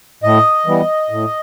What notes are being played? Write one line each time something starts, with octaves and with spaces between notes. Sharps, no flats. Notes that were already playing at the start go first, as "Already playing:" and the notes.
A2 D#5
E3 G3 B3
A2